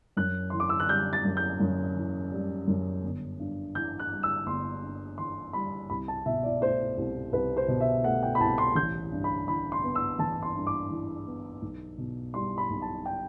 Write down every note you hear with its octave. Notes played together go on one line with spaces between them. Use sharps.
F#2 F#6
E3 C6
D6
E6
F#6
G3 G6
A6
F#2
G6
F#2
E3
G3
F#2
G1
G2
E3 G6
F#6
G3
E6
G1 C6
G2
E3 C6
G3 B5
C2 B5
A5
B2 E5
D5
A3 C5
C2
C2 B4
C5
B2
E5
A3 F#5
G5
B5
C2 A5
C6
A1 G6
G2
B5
E3 B5
C6
B3
E6
A1 A5
C6
G2
D6
E3
B3
B1
B2
G3 C6
B5
B1
A5
G5